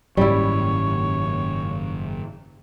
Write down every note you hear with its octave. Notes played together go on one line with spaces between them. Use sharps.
F#1 G#2 D#3 G3 C#4 E4 C#5